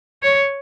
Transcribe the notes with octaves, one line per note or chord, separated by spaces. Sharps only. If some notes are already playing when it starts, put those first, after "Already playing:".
C#5